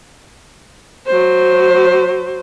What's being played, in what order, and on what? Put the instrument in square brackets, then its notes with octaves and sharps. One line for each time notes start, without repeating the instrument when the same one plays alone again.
[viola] F#3 C5